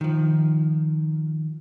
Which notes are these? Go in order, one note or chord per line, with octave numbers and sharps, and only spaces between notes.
D#3 F3